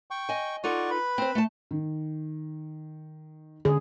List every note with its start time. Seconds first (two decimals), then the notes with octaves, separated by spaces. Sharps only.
0.11 G5 C#6
0.29 D#5 G#5
0.64 D#4 F4 A4 D5 F#5 C#6
0.90 B4 B5
1.18 C4 C5
1.35 A3 A5
1.71 D#3
3.65 D3 C#4 G#4